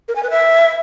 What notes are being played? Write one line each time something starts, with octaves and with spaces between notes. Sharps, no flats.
A#4
G#5
B4
E5